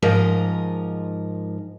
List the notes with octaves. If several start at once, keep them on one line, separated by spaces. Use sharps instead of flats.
G#2 F3 A#4 D#5